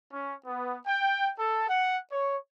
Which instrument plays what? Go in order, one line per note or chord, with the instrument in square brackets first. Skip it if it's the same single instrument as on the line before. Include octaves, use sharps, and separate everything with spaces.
[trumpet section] C#4
B3
G5
A4
F#5
C#5